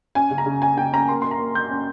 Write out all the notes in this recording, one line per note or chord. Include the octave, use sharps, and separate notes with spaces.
C#4 G#5
C#3
A#5
C#3
C#4 G#5
C#3 G5
C#4 A#5
A#3 C6
A#3 C6
A#5
A#3
A#3 G6
C#4